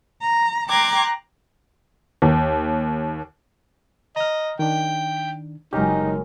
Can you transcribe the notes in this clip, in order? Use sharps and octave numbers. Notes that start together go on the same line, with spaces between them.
A#5
G5 A#5 C6 D6 F#6 G#6
D#2
D#5 A#5 F6
D#3 D4 G5
F#1 F#3 G#3 C#4 D#4 G4 A#4